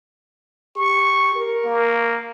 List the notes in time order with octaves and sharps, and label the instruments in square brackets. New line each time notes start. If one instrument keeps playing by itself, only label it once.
[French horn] G4 [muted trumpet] C#6
[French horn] A#4
[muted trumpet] A#3